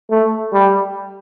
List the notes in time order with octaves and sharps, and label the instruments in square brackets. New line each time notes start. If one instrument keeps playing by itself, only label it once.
[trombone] A3
G3